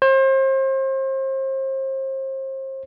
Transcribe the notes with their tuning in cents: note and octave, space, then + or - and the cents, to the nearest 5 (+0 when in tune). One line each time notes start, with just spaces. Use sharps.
C5 +35